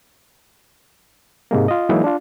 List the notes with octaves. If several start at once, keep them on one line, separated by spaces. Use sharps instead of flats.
G#2 C3 G#3 A#3
F4 D#5
E3 F#3 G#3 A#3 D#4 E4
D4 F4